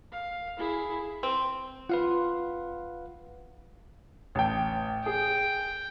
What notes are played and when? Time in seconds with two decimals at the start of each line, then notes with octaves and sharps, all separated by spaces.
0.12 F5
0.58 E4 G#4
1.23 C4
1.89 F4 B4 F5 F#5
4.35 A1 G5
5.06 G#4 G5